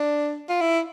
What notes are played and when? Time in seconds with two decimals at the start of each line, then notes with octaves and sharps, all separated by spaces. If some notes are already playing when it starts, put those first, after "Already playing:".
Already playing: D4
0.49 F4
0.61 E4